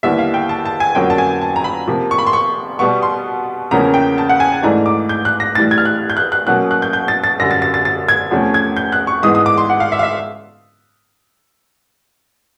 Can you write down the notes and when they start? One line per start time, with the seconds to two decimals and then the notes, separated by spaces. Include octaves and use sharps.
0.03 D#2 D3 G3 B3 E4 E5
0.19 F5
0.34 G5
0.49 A5
0.65 A5
0.80 G#5
0.95 F2 D3 F#3 A#3 C#4 G5
1.10 A5
1.18 G#5
1.41 A5
1.56 A#5
1.64 B5
1.88 C3 F3 A#3
2.11 C#6
2.18 B5
2.27 C6
2.33 C#6
2.79 B2 G3 B3 C#6
3.02 C6
3.71 E2 C#3 F3 A#3 C#4 A#5
3.94 G5
4.18 A5
4.29 F#5
4.40 G#5
4.52 A5
4.63 G#2 E3 A3 D4 A#5
4.86 D6
5.09 G6
5.25 F#6
5.40 A#6
5.55 A2 E3 G3 A6
5.71 G#6
5.78 F6
5.85 F#6
6.10 G6
6.17 F#6
6.32 F#6
6.47 B2 F#3 A#3 C#4 F#6
6.71 F#6
6.82 G6
6.93 G6
7.08 A6
7.24 A6
7.39 F#2 D3 G3 A#6
7.51 A6
7.62 A6
7.74 A6
7.85 A6
8.08 G#6
8.31 E2 C3 F3 A3 C#4
8.54 G#6
8.77 G6
8.92 F#6
9.07 C#6
9.22 G#2 E3 G#3 B3 D#6
9.35 D#6
9.46 D6
9.58 C6
9.70 F#5
9.80 F5
9.92 E5
9.99 F5
10.03 E5